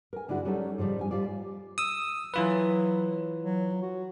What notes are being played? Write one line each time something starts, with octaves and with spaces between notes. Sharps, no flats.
A#4 G#5
G2 D3 G#3 E4 F#4
F#3 G3 C#4 D#4 A4 C#5
G#2 C#3 F3 G3
C#4 G#5
G#2 G3 F4 D5
D#6 E6
E3 F#3 F4 B4
F#3
F#4